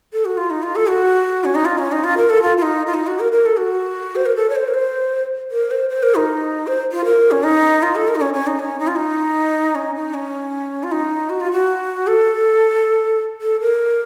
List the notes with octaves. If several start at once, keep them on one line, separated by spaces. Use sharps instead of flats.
A4
F#4
F4
D#4
F4
A4
F#4
C#4
D#4
F4
C#4
D#4
F4
A#4
A4
F4
F4
D#4
F4
D#4
F#4
A#4
A#4
A4
F#4
C5
A#4
A4
C#5
C5
A#4
C5
A#4
C5
C5
A#4
D#4
C5
F4
A#4
C#4
D#4
F4
A4
A#4
D#4
C#4
C#4
D#4
C#4
D#4
F4
D#4
C#4
D#4
C#4
F4
D#4
F#4
F4
F#4
A4
A4
A#4